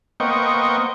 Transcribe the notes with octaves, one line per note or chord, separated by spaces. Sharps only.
A#3 B3 C5 D#5 G5 C#6